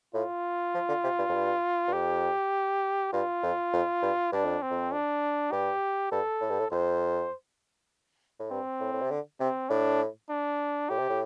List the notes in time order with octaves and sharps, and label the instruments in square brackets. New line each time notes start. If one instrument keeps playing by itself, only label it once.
[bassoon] A2 [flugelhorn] F4
[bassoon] F3
D3
C3
G2
F2
G2
G2
[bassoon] F2 [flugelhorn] G4
[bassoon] G2 [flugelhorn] F4
[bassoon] F2
F2
G2
[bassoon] G2 [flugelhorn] D4
[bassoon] F2
[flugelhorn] C4
[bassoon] F2
[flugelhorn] D4
[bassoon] G2 [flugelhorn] G4
[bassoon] G2 [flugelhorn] A4
[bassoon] A2
G2
A2
[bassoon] F2 [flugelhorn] C5
[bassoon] A2
[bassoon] G2 [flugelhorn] C4
[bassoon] A2
A2
C3
D3
[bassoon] C3 [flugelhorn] C4
[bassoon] A2 [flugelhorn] D4
[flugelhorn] D4
[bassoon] A2 [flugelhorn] G4
[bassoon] C3
A2